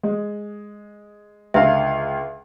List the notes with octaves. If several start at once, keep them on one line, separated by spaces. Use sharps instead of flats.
G#3
C#2 D3 E5 F5